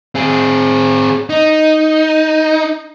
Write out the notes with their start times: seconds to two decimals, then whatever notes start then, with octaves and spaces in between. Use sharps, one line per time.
0.15 C4 G#4
1.30 D#4